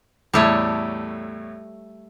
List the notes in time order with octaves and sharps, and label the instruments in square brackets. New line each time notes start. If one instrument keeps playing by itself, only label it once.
[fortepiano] E2 A2 E4 [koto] G3 A3 C#5